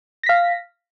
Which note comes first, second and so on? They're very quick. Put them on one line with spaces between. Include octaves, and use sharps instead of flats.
A#6 B6 F5